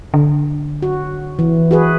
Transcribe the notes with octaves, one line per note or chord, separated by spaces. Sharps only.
D3
F#4
E3
F#4 G#4 B4